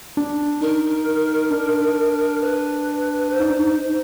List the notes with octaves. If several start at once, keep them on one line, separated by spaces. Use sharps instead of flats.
D4
D#4 A#4
D4
B4
C5
D#4
D4
D#4